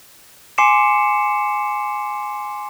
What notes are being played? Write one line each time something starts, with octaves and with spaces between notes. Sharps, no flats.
G#5 C6 D6 C7 C#7 E7